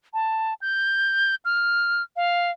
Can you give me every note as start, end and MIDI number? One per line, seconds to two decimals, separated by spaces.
0.14 0.54 81
0.61 1.35 91
1.45 2.03 89
2.16 2.51 77